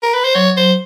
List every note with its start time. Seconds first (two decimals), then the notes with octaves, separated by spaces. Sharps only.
0.03 A#4
0.14 B4
0.25 C5
0.35 F#3 C#5
0.57 C5